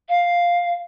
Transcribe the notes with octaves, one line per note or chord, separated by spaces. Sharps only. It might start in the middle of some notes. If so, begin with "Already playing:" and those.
F5